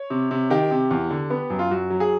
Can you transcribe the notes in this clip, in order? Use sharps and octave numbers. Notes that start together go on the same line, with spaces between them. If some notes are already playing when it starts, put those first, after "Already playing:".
Already playing: C#5
C3
C3
D#3 G4
C3
E2
D3
B3
F#2
F4
F#2 F#4
F#3
G#4